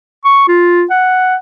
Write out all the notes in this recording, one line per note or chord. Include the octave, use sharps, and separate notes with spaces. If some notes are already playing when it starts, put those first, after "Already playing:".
C#6
F4
F#5